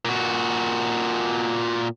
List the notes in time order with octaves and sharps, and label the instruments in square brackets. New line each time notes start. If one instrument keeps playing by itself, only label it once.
[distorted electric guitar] A#2 F#4